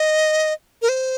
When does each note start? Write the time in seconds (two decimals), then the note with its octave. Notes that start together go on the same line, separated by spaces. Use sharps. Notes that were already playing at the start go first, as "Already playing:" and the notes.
Already playing: D#5
0.82 A#4
0.89 C5